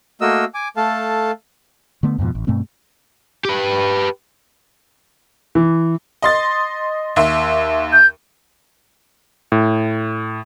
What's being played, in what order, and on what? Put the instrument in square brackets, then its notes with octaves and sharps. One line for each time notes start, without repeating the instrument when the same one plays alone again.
[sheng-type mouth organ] A3 A#3 F#4 A#4 D#5 E6
G#5 D6
A3 A4 F5 A5
[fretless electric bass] D3 A3 B3
F2 G#2 B2 F3
A1
G2 B2 A3 C4
[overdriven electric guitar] G4 B4
[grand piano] E3
[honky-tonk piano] D#5 C6 A6
D#2 E5 C6
[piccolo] G6
[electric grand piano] A2